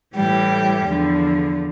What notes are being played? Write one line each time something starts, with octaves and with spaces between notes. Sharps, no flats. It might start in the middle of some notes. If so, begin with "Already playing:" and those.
A2 E3 G3 G4
E2 D3 F3